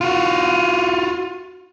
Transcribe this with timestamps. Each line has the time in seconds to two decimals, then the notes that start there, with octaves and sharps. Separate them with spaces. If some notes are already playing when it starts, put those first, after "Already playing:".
0.01 F4 F#4